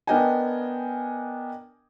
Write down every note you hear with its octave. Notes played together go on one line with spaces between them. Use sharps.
B3 D4 A#4 D#5 G5 G#5